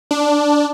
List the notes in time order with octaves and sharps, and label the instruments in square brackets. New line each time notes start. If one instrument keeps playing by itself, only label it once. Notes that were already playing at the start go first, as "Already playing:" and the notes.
[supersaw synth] D4